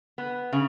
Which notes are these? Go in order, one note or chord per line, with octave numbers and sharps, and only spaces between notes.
B3
C#3